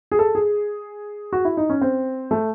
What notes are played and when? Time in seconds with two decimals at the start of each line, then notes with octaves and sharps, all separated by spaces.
0.12 G#4
0.19 A4
0.35 G#4
1.33 F#4
1.45 E4
1.57 D#4
1.70 C#4
1.82 C4
2.31 A3